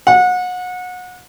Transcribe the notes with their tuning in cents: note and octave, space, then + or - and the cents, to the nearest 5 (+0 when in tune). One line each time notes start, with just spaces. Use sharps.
F#5 -30